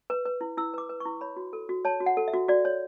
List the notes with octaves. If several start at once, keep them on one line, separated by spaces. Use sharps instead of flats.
B4
B4
E4
E4 E6
B4 D6
B4
C#6
E4
C#5 B5
F#4
A4
F#4
C#5 A5
F#4
F#5
A4
E5
F#4
F#4 D5
C#5